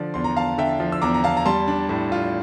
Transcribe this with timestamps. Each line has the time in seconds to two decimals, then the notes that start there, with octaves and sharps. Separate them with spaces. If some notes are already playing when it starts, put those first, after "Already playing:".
Already playing: D3 F3 D5
0.14 E2 C6
0.24 A#5
0.37 E2 F5 A5
0.58 D3 E5 G5
0.80 F3
0.92 E6
1.02 E2 A#5 D6
1.14 A#5
1.23 E2 F5 A5
1.37 A#5
1.46 G3 A5 C6
1.68 D4
1.89 A2
2.12 F4